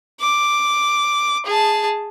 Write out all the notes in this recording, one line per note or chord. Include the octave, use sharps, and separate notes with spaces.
D6
G#4 A5